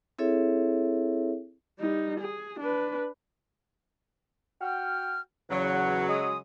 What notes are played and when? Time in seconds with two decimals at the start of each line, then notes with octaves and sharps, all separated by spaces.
0.19 C4 E4 G#4 A4 C#5 E5
1.79 G3 D#4
2.20 G#4
2.60 D4 B4
4.61 F#4 G5 F6
5.50 E2 C#3 F#3 F#5
6.09 G#3 D#6